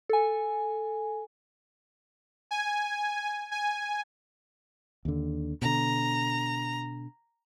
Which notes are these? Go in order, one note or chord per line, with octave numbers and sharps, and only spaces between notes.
A4 G#5
G#5
G#5
D#2 D3
B2 D3 A#5